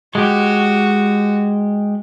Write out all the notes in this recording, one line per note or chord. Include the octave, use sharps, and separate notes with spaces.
G#3 F#4 G4